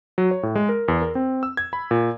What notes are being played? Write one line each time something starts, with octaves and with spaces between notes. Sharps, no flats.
F#3
C#5
A2
G#3
A#4
E2
A#4
C4
E6
G#6
B5
A#2